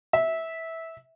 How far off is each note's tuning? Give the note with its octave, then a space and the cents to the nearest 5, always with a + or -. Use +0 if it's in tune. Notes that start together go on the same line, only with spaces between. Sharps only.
E5 -15